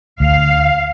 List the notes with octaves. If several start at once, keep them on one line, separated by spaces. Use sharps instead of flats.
D2 F5